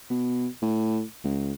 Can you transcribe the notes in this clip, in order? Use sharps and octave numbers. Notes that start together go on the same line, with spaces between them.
B2
A2
C#2